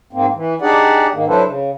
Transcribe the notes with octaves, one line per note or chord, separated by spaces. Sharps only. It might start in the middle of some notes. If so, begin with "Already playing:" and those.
G#2 A#3 C4
E3
D4 D#4 G4 G#4 D5 F#5
G#2 D#3 A#3
F#3 D4 E4 A4 B4 C5
C#3